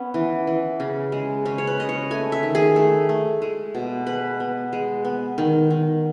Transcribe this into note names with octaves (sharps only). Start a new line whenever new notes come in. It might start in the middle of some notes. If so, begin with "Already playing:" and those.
Already playing: B3 C#4
E3
E3
C#3
G#3
C#3 C#4
C#5
B4
C#3 D#5
C#5
A3 G#5
E5
D#3
G#4
A3
A3
G#3
B2
G#3 B4
B3
G#3
B3
D#3
D#3